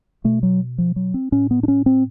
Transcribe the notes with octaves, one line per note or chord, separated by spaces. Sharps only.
B2 A3
F#3
F3
F#3
C4
A2 C#4
B3
D4
C#4
C4